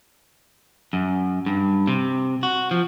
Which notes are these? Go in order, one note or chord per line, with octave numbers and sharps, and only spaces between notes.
F#2
G2
C3
F#4
F3